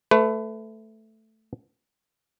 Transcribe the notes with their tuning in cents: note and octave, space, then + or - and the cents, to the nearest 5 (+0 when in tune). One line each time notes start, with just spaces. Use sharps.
A3 +0 B4 +30